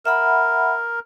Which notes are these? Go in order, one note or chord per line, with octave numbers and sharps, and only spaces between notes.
A#4 E5 F#5 B5